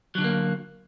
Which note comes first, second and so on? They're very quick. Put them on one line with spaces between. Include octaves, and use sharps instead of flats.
F#3 D3 G#3 A#3